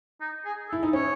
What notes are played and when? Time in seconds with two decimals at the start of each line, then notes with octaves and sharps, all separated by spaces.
0.21 D#4
0.45 G#4
0.69 A4
0.73 E4
0.83 D#4
0.93 C#4 C#5